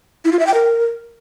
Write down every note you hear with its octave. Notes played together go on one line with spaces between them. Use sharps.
E4
F4
E5
G5
A#4